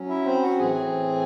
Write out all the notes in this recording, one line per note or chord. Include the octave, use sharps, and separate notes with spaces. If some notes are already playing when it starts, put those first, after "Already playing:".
Already playing: F#3 C#4
E4 E5
C4 C5
F#4 F#5
A2 E3 C4 G#4 G#5